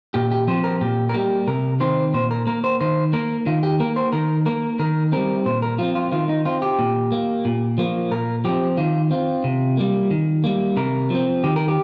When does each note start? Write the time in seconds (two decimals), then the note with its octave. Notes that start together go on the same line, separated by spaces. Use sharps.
0.14 A#2 G4
0.31 G4
0.48 F3 C4 C5
0.64 A#4
0.81 A#2 G4
1.09 A#4
1.14 G3 A#3 G4
1.47 C3 A#4
1.80 D#3 C4 C5
2.14 A#2 C5
2.31 A#4
2.47 A#3 A#4
2.64 C5
2.81 D#3 C5
3.13 A#3 A#4
3.46 D#3 F4
3.63 G4
3.80 A#3 A#4
3.96 C5
4.12 D#3 A#4
4.46 A#3 A#4
4.79 D#3 A#4
5.12 G3 C4 A#4
5.46 A#2 C5
5.62 A#4
5.78 F3 C4 F4
5.95 F4
6.12 D#3 F4
6.29 D#4
6.45 C4 F4
6.62 G4
6.79 A#2
7.12 A#3
7.45 A#2
7.78 F3 A#3
8.11 A#2 A#4
8.45 F3 C4 G4
8.77 D#3 F4
9.11 C4 F4
9.44 C3
9.77 G3 A#3
10.11 D#3
10.44 G3 A#3
10.77 C3 A#4
11.10 F3 C4
11.44 D#3 G4
11.56 A#4
11.68 G4